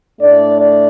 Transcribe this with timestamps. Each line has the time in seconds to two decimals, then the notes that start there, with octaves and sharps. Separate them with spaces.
0.20 A2 A3 D4 D5
0.59 D5